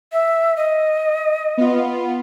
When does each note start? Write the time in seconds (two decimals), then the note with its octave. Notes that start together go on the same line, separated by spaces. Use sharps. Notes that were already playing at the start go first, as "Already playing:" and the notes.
0.12 E5
0.57 D#5
1.57 B3 F4